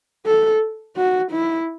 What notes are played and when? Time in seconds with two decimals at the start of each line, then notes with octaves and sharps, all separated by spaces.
0.26 A4
0.97 F#4
1.32 E4